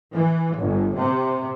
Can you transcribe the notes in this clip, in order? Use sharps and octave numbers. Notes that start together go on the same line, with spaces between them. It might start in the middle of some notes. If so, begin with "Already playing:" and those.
E3
G1
C3